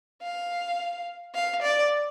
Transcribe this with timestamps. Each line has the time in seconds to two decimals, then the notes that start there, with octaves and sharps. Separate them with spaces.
0.22 F5
1.35 F5
1.63 D5